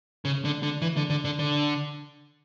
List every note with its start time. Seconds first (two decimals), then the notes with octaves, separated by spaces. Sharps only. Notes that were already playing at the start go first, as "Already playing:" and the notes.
0.25 C#3
0.45 D3
0.63 D3
0.82 E3
0.97 D3
1.10 D3
1.25 D3
1.39 D3